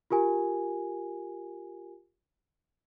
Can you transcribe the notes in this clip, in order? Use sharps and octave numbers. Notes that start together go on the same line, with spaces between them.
F4 G4 A#4 G#5